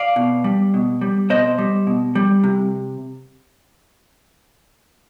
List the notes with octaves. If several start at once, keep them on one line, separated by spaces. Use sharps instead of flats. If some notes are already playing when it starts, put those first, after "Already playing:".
Already playing: D5 F5
B2
G3
B2
G3
B2 C5 D#5
G3
B2
G3
C3